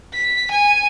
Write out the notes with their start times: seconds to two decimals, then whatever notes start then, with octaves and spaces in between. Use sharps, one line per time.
0.14 B6
0.51 G#5